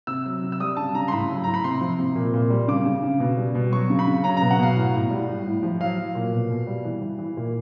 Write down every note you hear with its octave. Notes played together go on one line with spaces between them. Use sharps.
C3 E6
F#3
C3
E6
G3 D#6
C#3 A5
C#3 A#5
C6
A2 B5
F#3
A2 A#5
B5
C3 C6
F3
C3
A#2
A#2
G3
C#3 D6
C#3
C#3
B2
G3
B2
F#3 C#6
C#3
B5
C#3
F#3 A#5
B2 A#5
F#5
B2 F5
A2
A2
G3
A2
A2
F3
F#3 F5
F#3
A#2
B2
B2
G3
E3
E3
E3
A#2